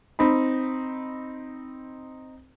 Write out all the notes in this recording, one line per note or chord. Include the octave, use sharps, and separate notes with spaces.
C4 D#4 B5